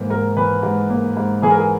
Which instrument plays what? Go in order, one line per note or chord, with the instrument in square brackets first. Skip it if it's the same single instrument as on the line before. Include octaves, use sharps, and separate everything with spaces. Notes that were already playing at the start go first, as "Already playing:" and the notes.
Already playing: [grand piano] G#2 E3 A#3
G#2 A#4
E3 B4
G#2
A#3
G#2
E3 G#4
A#4
G#4